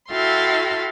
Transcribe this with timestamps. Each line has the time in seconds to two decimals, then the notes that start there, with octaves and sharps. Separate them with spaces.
0.10 E4 F#4 A4 F5 G5 C6